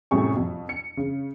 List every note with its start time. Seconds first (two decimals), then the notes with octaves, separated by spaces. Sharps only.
0.11 F#2 A2 C3 G3 G#4 C#6
0.37 F2
0.69 C#7
0.97 C#3